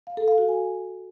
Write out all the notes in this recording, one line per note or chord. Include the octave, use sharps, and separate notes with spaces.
F5
A4
F5
F#4
G#5